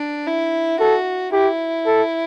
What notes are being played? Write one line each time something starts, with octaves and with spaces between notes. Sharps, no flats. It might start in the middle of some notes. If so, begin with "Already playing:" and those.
Already playing: D4
E4
F#4 A4
E4 G4
A4